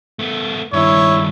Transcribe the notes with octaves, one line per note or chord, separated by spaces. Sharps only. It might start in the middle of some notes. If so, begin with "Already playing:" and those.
A3 B3
G2 D#3 E4 C#5